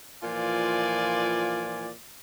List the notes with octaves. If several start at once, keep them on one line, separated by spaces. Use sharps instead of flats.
A#2 E3 F3 F4 D5 G#5